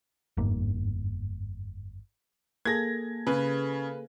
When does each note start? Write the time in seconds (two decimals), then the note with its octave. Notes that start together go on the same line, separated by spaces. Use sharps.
0.37 G1 F2 G#2 A#3
2.65 A#3 G#4 A4 G#6 A#6
3.27 C#3 B4